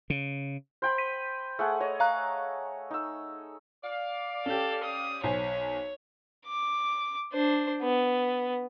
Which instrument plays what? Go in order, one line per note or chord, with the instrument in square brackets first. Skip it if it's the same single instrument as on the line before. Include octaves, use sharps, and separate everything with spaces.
[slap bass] C#3
[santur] C5 G5 B5
[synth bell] B6 D#7
[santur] A3 G#4 F#5
C#5 D#5
[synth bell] F5 A#5 F#6
[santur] D#4 E6
[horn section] D5 F5
[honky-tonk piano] C#4 G4 [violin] A4
[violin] D#6
[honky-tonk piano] B1 C5 G#5 [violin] C#5
[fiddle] D6
D4 C5
B3